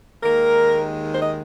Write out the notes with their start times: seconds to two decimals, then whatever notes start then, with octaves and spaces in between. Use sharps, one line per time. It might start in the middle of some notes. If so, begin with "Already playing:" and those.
0.23 D#2 D#3 G#3 A#3 A#4
1.12 C5
1.22 D#5